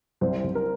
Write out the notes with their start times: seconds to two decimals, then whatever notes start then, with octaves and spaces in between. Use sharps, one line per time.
0.21 C2 C5
0.44 C2
0.55 A#4